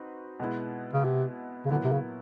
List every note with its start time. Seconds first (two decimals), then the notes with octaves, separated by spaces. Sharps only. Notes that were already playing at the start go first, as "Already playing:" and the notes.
Already playing: C4 D#4 F#4 B4
0.40 B2 G#3 B3 E4
0.93 C#3
1.05 C3
1.65 C#3
1.70 A#2 D3 F#3 B3 E4
1.84 C3
1.92 C#3